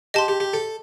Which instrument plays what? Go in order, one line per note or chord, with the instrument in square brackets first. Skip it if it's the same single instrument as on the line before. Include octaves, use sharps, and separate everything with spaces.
[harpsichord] G4 [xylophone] D#5 A5 C6
[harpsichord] G4
G4
A4